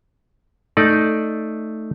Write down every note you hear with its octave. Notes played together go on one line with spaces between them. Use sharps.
A3 D#4 D5